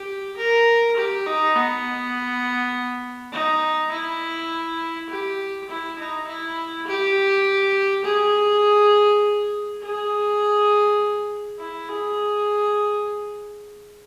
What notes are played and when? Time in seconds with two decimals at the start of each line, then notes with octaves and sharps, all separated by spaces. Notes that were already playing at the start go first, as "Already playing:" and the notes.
Already playing: G4
0.37 A#4
0.96 G4
1.26 D#4
1.56 B3
3.33 D#4
3.92 E4
5.10 G4
5.69 E4
5.99 D#4
6.27 E4
6.87 G4
8.05 G#4
9.82 G#4
11.59 E4
11.88 G#4